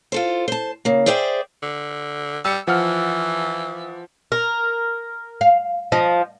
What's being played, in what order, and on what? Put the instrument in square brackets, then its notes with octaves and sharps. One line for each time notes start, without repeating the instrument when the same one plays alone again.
[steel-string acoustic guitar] F4 A4 C5
C5 A5
C#3 A#3
G#4 C5 D5 E5 F#5 G5
[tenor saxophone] D3
[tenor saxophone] G3 [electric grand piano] E6 C#7
[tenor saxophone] E3 [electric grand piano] F3 F#5 F6
[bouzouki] A#4
[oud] F5
[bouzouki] F3 [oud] D#5